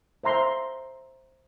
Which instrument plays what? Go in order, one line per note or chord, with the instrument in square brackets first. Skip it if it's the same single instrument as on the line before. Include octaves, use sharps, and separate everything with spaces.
[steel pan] C5 E5 A#5 C6